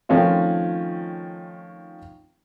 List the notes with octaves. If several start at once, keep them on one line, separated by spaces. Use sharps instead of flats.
D#3 F3 A3 C4 C#4 F4